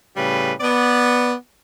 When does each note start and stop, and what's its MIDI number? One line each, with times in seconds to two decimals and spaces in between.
0.16 0.52 45
0.16 0.52 49
0.16 0.52 55
0.16 0.52 71
0.61 1.33 59
0.61 1.33 74